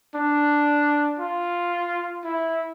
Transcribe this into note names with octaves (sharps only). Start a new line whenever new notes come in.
D4
F4
E4